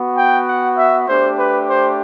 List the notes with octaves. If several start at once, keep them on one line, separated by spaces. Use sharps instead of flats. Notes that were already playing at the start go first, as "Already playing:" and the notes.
Already playing: B3 F#4
G5
F#5
E5
A3 D4 G4 C5
B4
C5